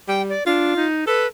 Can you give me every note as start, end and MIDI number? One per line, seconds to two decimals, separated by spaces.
0.08 0.34 55
0.08 0.22 79
0.29 0.44 74
0.46 0.74 62
0.46 0.86 65
0.76 1.07 63
1.07 1.26 69
1.07 1.27 71